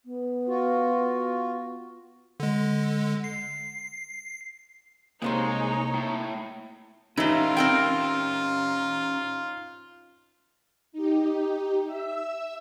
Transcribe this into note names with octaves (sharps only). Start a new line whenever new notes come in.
B3
F4 F#4
D3 G#3
C7
C2 C3 G#3 A#3 D#4 C5 C#5
A2
E3 A3 C#4 D#4 F4 G4
C4 A#4 G5
D#4 G4
E5 E6